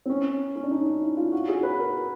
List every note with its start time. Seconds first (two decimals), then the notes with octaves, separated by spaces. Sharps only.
0.06 C4
0.10 C#4
0.56 C#4
0.63 D4
0.71 D#4
0.86 D#4
1.02 E4
1.17 F4
1.32 F#4
1.48 G#4
1.63 B4
1.79 A#4